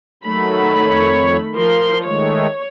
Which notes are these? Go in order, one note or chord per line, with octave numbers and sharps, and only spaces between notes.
D#3 F#3 A3 B5
F2 C#5
F3 A#4 C6
D#3 G#3 A3 C#5